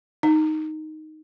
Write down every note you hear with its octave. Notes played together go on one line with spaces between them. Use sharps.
D#4